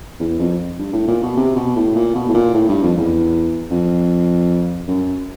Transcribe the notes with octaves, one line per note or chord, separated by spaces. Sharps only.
E2
F2
G2
A2
A#2
B2
C3
B2
A2
A#2
B2
A2
A#2
A2
G2
F2
E2
F2
F#2